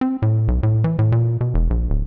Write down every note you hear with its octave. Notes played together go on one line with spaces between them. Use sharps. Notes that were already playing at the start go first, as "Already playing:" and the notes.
C4
A2
B1
A2
E3
A2
A#2
B2
E1
A#1
D1